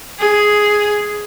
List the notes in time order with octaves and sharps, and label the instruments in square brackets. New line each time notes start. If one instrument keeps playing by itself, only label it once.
[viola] G#4